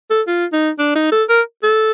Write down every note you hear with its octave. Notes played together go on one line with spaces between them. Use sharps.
A4
F4
D#4
D4
D#4
A4
A#4
A4